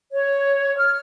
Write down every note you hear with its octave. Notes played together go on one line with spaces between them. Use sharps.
C#5
F6